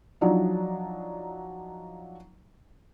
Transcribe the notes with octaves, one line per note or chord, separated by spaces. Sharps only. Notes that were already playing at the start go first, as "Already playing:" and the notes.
F3 F#3 D4 D#4